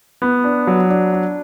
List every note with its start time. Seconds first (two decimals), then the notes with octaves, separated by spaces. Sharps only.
0.22 B3
0.44 D4
0.67 F#3
0.90 D4
1.13 D4